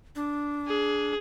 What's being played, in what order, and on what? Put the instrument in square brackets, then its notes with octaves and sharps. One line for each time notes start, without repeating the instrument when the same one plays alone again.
[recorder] D4
[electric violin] G#4